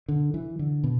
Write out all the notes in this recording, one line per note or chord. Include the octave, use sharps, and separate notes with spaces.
D3
E3
D3
B2